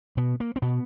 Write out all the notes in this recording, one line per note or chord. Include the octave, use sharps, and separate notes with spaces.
B2 B3
A#3
C4
B2 B3